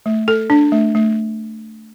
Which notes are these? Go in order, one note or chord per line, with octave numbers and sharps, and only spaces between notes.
A3
A4
D4
A3
A3